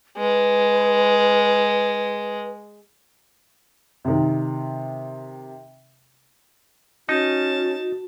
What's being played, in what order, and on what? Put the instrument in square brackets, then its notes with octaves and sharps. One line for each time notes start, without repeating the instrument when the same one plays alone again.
[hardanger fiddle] G#3 [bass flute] B4
[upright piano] C3 D#3
[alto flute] C#4 [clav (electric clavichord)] D#4 [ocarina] F#4 [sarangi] A5